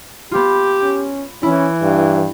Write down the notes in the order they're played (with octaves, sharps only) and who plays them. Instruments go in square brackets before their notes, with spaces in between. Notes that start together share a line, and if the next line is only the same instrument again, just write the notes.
[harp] B3 F4 [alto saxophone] G4
[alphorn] C#4
[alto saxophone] E3 [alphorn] C#4 [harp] E4
[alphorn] G2